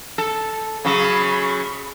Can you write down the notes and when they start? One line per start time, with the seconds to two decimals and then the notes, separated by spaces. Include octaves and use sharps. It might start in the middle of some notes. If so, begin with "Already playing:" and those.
0.18 A4
0.85 C#3 F#3 B5 C#6